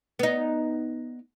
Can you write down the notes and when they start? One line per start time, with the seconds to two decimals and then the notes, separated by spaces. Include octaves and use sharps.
0.19 B3 D#4